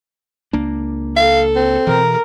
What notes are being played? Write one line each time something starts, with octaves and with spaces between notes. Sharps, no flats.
C#2 A#3 D4
A4 F5
C4
B2 E3 A#4